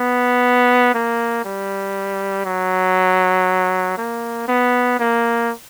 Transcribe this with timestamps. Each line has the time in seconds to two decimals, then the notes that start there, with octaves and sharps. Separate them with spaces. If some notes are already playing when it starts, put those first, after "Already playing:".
Already playing: B3
0.94 A#3
1.45 G3
2.46 F#3
3.98 A#3
4.48 B3
4.99 A#3